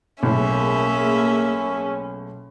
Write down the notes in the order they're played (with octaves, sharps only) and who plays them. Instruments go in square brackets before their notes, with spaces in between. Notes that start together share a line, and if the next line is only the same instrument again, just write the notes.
[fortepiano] B1 A2 [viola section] A#3 G#4 [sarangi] C#4 [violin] E5